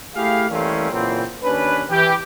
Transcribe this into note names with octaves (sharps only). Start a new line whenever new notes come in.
A3 E4 G4 G#4 F5
E3 G3 A3 A#3 C4 C#4
A#2 C#3 E3 F#3 C4
D#2 C#4 D4 B4
E3 G4